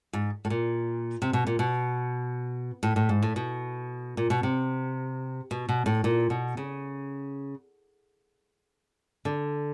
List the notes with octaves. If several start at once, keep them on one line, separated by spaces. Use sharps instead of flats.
G#2
A2
A#2
C3
B2
A#2
B2
A2
A2
G#2
A2
B2
A#2
B2
C3
B2
B2
A2
A#2
B2
C#3
D3